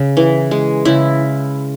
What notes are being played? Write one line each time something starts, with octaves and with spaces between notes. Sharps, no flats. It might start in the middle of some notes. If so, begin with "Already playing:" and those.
Already playing: C#3
E3
G#3
C#3 E4